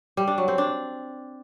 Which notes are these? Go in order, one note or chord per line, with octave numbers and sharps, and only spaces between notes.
G3
D4
F#3
C4
D4